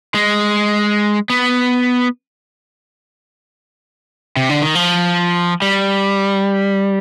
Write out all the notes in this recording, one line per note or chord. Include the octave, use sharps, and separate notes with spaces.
G#3
B3
C3
D3
D#3
F3
G3